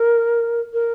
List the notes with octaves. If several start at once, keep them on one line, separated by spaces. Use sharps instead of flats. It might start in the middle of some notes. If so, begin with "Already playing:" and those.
Already playing: A#4
A#4